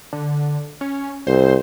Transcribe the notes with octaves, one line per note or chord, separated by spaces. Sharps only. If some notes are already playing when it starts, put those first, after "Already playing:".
D3
C#4
C2 C5